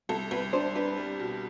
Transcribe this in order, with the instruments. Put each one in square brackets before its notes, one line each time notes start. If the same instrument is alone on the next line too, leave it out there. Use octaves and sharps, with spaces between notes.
[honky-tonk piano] C2 [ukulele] A4
[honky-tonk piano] C2 [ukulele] B4
[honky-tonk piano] D4 [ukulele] C5
[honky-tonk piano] D4 [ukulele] B4
[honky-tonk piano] G3
B2